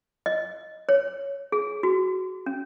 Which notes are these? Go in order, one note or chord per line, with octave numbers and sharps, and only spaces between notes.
D#5
C#5
G#4
F#4
C#4